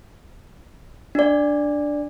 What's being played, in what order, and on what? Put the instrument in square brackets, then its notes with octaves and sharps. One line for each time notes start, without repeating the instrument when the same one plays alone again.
[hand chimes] D4 D5